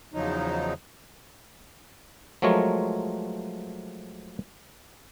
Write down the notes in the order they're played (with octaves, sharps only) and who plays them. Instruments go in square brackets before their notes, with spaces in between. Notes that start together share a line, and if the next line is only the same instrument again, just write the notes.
[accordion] E2 C#3 F3 F#3 D#4
[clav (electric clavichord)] F3 F#3 G#3 A3 A#4 C#5